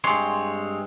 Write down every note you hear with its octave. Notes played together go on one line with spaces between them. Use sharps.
G2 G#3 C4 C#5 C6